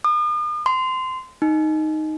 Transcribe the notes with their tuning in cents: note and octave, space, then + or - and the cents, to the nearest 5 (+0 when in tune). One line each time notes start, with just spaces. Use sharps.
D#6 -45
C6 -20
D#4 +0